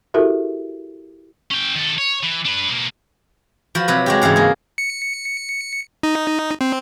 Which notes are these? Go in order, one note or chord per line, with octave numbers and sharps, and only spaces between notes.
E4 F#4 G4 A4 A#4 E5
C#4 G5
D#3 A4
C#5
E3
D4 B4
B2 A#3
F3 F#4 B4
C3 F#3 B4
G#3 F#4 G4
G#2 C#3 E3 F5 F#5
A#3 G#4
C#7
D#4
C4